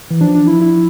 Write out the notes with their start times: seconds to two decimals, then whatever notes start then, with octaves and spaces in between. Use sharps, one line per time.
0.11 E3
0.21 F3 D4
0.35 D4
0.47 E4
0.61 E4